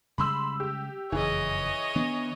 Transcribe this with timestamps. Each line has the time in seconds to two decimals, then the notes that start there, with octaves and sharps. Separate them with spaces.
0.18 C#3 G3 G#3 B5 C6 E6
0.60 G4
1.12 F#1 F2 C#3 E3 C#5 D#5
1.95 D#3 B3 D4